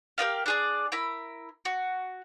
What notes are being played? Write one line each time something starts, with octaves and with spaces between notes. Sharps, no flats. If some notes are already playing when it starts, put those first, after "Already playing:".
G4 A#4 D#5 F5
D4 G#4 D5
E4 A#4 B5
F#4